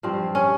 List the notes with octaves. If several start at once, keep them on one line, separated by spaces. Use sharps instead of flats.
G2 F3 C4
C#4